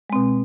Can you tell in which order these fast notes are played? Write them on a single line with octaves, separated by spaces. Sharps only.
G#3 C4 B2